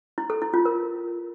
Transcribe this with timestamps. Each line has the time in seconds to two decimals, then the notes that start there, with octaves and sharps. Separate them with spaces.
0.18 E4
0.30 A4
0.42 E4
0.54 F4
0.65 A#4